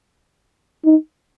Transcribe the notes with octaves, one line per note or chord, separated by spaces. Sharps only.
D#4